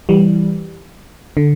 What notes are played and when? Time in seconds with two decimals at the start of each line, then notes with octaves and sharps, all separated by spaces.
0.09 E3 G3
1.37 D3